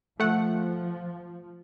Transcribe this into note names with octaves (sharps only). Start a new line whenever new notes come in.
F3 A3 F#5